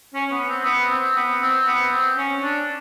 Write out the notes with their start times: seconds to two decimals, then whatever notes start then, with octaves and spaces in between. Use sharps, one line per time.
0.14 C#4
0.32 B3
0.49 C4
0.65 B3
0.91 C4
1.16 B3
1.42 C4
1.67 B3
1.92 C4
2.17 C#4
2.43 D4